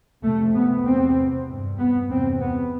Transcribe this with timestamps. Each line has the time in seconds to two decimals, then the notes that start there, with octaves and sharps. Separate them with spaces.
0.23 F2 C3 A3
0.54 B3
0.85 E2 C3 C4
1.47 G2
1.79 B3
2.09 E2 C3 C4
2.40 B3